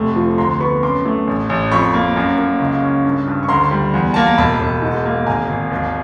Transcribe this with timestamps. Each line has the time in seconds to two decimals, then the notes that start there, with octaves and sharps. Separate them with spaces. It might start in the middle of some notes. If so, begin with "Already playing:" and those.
Already playing: F1 A3
0.16 F3
0.38 D2 A#5 C6
0.60 B3 B5 C#6
0.83 F#2 C6 D6
1.05 A3
1.27 A1
1.49 A1
1.72 F2 B5 C#6
1.94 A#3
2.16 F#2
2.38 A#3
2.60 C#2
2.82 C#4
3.05 G2
3.27 G2
3.43 C#6
3.49 D2 A#5 C6
3.71 G3
3.94 E2
4.14 A#3 A5
4.26 A#5
4.38 E1 A5 B5
4.60 E1
4.82 G#2
5.05 A#3
5.26 G#1 G#5 A#5
5.49 G#1
5.72 D#2